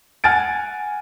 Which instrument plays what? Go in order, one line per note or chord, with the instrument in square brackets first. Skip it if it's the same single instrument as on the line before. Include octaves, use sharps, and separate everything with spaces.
[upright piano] F#5 G#5 F6 A6 D7